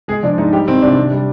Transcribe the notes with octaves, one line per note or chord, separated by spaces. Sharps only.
G#3 G#4
F3 D4
G#2 D#4
G3 G4
D#3 C4
C3 D4
C3
G3